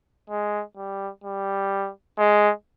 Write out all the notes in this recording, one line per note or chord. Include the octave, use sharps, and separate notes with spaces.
G#3
G3
G3
G#3